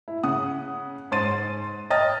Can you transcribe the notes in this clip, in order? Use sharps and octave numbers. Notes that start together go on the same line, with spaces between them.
E4
C#3 F#5 D#6
G#2 C5 C6 A6 D#7
D#5 G5 D#6 F6 A6 A#6